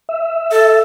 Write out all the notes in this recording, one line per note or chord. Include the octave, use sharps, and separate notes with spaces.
E5
A4